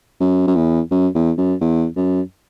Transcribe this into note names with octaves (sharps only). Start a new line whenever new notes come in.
F#2
F#2
E2
F#2
E2
F#2
E2
F#2